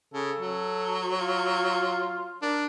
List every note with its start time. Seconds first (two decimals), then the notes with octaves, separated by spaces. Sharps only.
0.13 C#3 A4
0.39 F#3
1.19 F4
2.42 D4 A#4